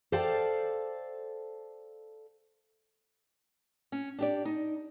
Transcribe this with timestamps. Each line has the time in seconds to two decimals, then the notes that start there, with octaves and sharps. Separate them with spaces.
0.12 A4 C5 D5 F5 G5 A5
3.92 C#4
4.19 D4 G4 D5
4.45 D#4